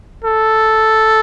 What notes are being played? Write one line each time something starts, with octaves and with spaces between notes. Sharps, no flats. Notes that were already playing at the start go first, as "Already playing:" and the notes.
A4